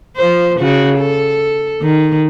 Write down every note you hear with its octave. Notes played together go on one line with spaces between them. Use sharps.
F3 C5
C#3 F#4
A4
D#3